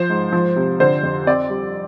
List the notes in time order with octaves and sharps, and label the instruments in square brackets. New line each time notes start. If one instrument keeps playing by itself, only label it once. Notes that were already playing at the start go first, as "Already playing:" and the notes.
Already playing: [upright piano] F3 C5
G#2
F3
C3
D3 C5
F2
C4 D5
G3